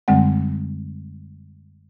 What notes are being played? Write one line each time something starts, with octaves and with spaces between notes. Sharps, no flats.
F#2 D3 G3 G#3 C4 F#5